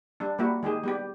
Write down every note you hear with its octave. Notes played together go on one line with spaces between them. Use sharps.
G3 D4
G3 A#3 E4 F#4
D#3 G#3 G4 G#4
G3 B3 G4